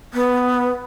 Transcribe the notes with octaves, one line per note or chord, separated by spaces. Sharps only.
B3